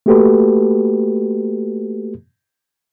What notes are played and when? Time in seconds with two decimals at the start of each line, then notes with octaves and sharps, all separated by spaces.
0.06 A3 A#3 F#4 G4 A4 B4